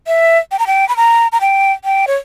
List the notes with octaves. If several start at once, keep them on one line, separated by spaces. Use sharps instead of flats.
E5
G5
A#5
G5
B5
A#5
A#5
G5
G5
C#5